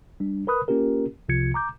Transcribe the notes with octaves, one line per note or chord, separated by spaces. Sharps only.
G3 D4
A#4 B4 B5 D#6 F#6
A#3 C#4 F4 G4 A#4
C2 C3 F3 F4 G#6 C#7
A#5 D6 G6